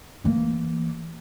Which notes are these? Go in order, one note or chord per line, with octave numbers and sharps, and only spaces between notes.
E3 A#3